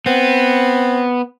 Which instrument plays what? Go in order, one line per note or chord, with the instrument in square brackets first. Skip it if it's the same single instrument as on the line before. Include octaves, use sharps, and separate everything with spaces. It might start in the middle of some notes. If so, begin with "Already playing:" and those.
[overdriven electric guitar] B3 [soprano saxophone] C4